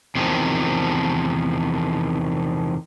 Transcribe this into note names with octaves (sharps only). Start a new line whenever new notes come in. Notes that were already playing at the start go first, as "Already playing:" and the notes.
E2 C3 D#3 F3